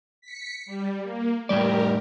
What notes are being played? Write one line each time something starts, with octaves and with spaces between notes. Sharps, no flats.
B6 C#7
G3
A#3
A2 G3 G4 A#4 D5